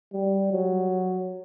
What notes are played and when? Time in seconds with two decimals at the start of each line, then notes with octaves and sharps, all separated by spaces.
0.13 G3
0.52 F#3